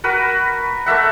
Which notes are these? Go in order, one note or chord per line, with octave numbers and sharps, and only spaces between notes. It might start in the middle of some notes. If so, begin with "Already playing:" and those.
F#4 A#4 B4
A3 A#3 E5 F#5